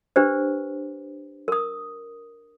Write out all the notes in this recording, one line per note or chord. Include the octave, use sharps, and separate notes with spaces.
D4 G4 B4 C5
A#4 D#6